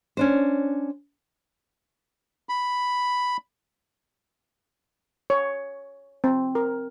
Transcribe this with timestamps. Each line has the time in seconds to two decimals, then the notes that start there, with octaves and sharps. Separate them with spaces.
0.17 C#4 D4 C5
2.49 B5
5.30 C#5
6.24 C4
6.55 A#4